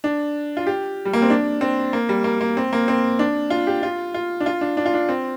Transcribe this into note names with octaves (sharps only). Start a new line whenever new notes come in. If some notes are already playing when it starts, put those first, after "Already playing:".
D4
F4
G4
G3
A#3
C4
D4
C4
A#3
G3
A#3
A#3
C4
A#3
C4
D4
F4
G4
F4
F4
D4
F4
D4
D4
F4
D4
C4